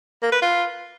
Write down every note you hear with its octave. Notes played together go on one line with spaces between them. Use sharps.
A#3
B4
F4